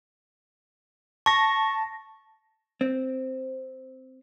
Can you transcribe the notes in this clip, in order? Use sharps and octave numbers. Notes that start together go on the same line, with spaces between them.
A5 C#6 A#6
C4